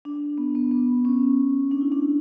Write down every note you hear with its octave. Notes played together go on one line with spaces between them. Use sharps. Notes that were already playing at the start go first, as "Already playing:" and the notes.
D4
B3
B3
B3
C#4
D4
E4
D4